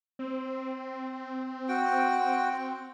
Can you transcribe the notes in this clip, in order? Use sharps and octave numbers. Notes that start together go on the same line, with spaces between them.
C4
F#4 G5